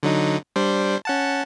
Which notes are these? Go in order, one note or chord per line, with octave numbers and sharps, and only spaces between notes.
D3 F#3 D#4
G3 D4 C5
C#4 F#5 A5